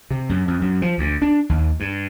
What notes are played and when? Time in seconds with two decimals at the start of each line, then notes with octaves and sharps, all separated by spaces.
0.10 C3
0.29 F#2
0.48 F2
0.62 F#2
0.82 F3
0.98 D2
1.22 D4
1.49 D#2
1.80 G2